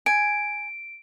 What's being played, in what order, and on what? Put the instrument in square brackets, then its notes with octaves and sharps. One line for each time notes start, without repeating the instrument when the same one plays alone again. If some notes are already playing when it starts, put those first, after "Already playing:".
[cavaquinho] G#5 [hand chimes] D7